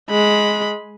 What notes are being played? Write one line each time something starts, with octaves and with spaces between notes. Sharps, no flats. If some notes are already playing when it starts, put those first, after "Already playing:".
G#3 B5